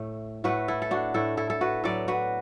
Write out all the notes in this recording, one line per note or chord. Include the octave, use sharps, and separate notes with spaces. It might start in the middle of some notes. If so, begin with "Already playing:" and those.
Already playing: A2 A3
A2 A3 F#4 B4
E4 A4
A4
D4 F#4
A2 A3 E4 A4
E4 A4
A4
F#4 B4
A2 F#3 B3 A4 D5
F#4 B4